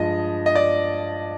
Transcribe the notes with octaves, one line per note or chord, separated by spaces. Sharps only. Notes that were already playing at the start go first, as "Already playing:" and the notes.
Already playing: G2 F3 G#3 D#5
D#5
D5